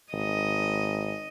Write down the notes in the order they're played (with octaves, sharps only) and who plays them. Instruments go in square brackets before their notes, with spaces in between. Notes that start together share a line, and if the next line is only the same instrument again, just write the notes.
[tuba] G#1 [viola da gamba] D#5